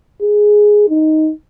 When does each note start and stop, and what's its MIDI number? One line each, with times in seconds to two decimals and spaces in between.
0.22 0.86 68
0.89 1.31 63